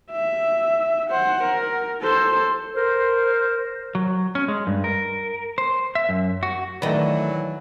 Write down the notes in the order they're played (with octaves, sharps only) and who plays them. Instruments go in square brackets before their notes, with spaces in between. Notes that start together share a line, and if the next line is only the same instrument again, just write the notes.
[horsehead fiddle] E5
C5 F#5
A#4
A4 C5
[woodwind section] A#4 C5
[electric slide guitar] F#3
C#4
G#3
G2
A#4
C5
E5
F#2
F#4
[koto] D#3 [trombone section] E3 F#3 [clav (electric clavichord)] A3 B4 [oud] D4 D#5